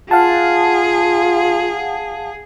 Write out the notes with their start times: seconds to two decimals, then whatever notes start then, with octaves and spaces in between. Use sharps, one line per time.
0.11 F4 G#4 F5 F#5 A5